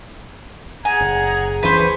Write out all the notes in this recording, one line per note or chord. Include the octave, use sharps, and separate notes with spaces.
G#4 F#5 G#5 A#5 G#6
F#1
D2 E3 C#4 B4 C5 C#6